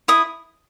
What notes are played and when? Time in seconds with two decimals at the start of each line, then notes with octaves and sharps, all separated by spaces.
0.08 E4 D#6